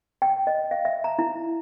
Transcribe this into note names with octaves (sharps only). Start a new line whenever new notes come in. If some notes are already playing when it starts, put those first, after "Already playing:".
G5
D#5
F5
E5
A#5
E4